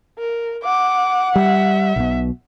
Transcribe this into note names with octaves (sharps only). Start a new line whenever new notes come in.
A#4
F#5 D6
G3 E5
B1 B2